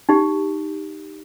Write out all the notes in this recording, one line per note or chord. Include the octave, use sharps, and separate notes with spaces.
D#4 G4